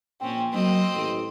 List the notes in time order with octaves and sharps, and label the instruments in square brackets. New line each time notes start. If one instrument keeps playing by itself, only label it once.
[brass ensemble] A#1 A#2 G5 [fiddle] C4 C#4
[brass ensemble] F#3 A#3 [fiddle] C4 D#5
[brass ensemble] A1